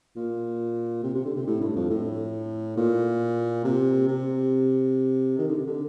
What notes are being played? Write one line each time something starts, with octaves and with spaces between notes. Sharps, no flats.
A#2
C3
C3
D3
C3
A2
G2
F2
A2
A#2
C3
C3
D#3
D3
C3
D3